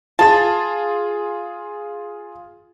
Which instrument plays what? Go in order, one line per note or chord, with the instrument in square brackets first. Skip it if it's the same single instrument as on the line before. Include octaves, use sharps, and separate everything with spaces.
[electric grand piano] F4 G#4 A6 [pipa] A5